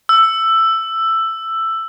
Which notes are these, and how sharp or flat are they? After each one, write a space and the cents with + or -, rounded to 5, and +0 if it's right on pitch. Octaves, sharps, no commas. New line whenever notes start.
E6 +10